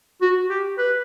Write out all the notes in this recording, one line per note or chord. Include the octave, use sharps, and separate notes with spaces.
F#4
G4
B4